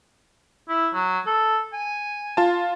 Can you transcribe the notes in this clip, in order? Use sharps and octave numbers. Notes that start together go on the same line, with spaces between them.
E4
F#3
A4
G#5
F4 A5